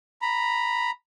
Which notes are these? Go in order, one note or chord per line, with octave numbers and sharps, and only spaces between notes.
A#5 B5